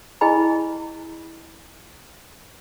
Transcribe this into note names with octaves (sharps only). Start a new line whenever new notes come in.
E4 G#4 D#5 G#5 B5